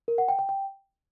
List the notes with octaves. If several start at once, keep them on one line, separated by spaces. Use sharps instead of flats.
A#4
F#5
G5
G5
G5